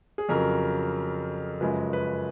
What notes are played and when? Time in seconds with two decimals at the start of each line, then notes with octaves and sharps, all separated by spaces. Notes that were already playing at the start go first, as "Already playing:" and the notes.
0.18 G#4
0.29 F2 C#3 F#3 A#4
1.61 F#2 C#3 F3 G#3 B4
1.93 B4